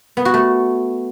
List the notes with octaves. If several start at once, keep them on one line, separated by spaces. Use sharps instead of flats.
B3
F#4
A3